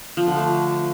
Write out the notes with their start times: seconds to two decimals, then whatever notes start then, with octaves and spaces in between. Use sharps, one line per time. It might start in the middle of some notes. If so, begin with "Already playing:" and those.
0.17 F3
0.27 D3
0.37 A3